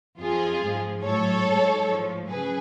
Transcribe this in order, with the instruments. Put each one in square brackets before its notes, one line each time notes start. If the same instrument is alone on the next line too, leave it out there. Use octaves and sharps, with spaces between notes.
[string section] F2 F3 F4 G#4
G#2 F3
A2 F#3 A4 C#5
G#2 F#3
A2 F3
C#3 F#3 G#4 B4